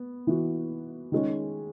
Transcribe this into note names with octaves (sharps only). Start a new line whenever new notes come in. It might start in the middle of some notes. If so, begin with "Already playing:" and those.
Already playing: B3
E3 B3 F#4
D#3 G#3 C#4